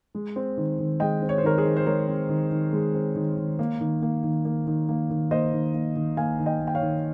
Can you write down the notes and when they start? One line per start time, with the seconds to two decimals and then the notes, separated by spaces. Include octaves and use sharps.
0.15 G#3
0.36 C4
0.57 D#3
0.79 D#3
1.00 G#3 D#5 G5
1.22 C4
1.29 C#5
1.38 C5
1.43 D#3 A#4 C#5
1.58 G#4 C5
1.65 D#3
1.77 C5
1.86 G#3 A#4 C#5
2.08 C4
2.29 D#3
2.51 D#3
2.73 G#3
2.94 C4
3.16 D#3
3.37 D#3
3.59 A#3
3.80 D#3
4.02 A#3
4.23 D#3
4.45 A#3
4.67 D#3
4.89 A#3
5.10 D#3
5.31 A#3 C5 D#5
5.53 D#3
5.74 A#3
5.96 D#3
6.17 A#3 F5 G#5
6.39 D#3
6.46 D#5 G5
6.61 A#3
6.67 G5
6.75 C#5 F5
6.82 D#3